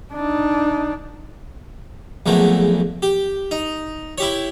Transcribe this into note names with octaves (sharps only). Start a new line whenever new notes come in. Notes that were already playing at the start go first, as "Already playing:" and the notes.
D4 D#4
A#1 E2 F#3 A3
G4
D#4
E4 G4 C#5